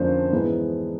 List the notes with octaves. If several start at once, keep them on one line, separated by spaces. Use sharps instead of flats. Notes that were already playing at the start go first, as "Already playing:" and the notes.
Already playing: F2 D3 F3 A#3 C#4 C5 D5
G#2 E3 G#3 B3